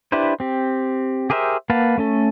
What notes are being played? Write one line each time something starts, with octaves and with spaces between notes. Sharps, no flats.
D4 E4 G4 B4 C5
C4 G4
G4 G#4 A#4 C5 E5
A#3 B4 F5 F#5 A5
A3 C#4 A4